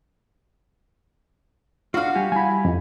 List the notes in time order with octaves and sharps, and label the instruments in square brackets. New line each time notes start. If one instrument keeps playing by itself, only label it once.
[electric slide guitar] D4 F4 [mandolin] F#4 F5
[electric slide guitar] G3 G4 G#5
[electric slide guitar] G3 E4 [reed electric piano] G#5 B5
[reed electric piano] F2